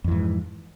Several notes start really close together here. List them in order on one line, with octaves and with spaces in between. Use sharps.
F2 E3 G#2